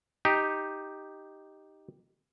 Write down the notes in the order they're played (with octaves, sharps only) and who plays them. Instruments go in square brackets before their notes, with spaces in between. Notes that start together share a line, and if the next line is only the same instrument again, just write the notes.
[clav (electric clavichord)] D#4 G4